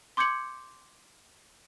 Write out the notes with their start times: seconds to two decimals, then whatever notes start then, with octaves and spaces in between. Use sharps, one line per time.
0.17 C6 D6 G6 G#6 C#7 F#7